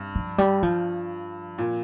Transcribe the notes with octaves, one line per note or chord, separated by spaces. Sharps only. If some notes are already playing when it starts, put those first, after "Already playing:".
Already playing: G2
F3
G3
F3
A#2